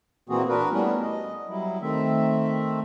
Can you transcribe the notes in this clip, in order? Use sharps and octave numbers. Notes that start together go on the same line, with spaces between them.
A#2 E3 A#3 C4 F#4 G#4
D4 F#4 A#4 B4
G3 A3 B3 C#4 D4 E4
D#5
F#3 G3 E4
D#3 A3 C4 E5